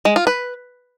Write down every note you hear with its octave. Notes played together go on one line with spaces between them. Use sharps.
G#3
F4
B4